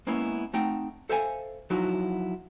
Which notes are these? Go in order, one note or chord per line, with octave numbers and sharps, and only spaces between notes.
G#3 A#3 B3 C#4 E4
A3 C4 D#4 F#5 G5
A4 C5 E5 F5 G5 G#5
F3 F#3 D#4 E4 F#4